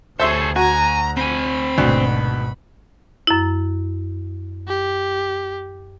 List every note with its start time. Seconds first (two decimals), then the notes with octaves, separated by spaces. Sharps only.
0.20 D2 G#4 A4 C5 C#5 E5 C6
0.56 F#4 G#5 A#5
1.17 C4 G#5 B5
1.78 G#1 D2 B2
3.27 F#2 E4
4.68 G4